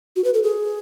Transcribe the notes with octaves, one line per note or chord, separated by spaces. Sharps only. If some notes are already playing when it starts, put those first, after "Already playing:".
F#4
B4
A4
G#4